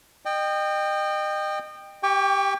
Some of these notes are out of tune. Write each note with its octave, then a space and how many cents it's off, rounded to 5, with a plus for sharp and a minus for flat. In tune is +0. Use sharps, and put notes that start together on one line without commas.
D#5 -30 G5 +10
G4 +0 G5 +30 C#6 +30